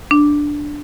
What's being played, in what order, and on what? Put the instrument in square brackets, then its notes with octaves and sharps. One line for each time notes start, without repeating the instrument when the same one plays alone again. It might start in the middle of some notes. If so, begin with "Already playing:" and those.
[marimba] D4